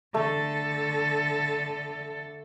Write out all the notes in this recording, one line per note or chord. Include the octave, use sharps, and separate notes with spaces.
D3 A3 A4